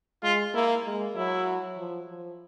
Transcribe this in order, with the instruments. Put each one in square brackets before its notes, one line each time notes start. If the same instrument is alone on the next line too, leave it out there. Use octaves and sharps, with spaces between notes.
[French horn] G#3 [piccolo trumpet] F4
[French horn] A#3 [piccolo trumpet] E4
[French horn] G#3
[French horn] F#3 [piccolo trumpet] E4
[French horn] F3
F3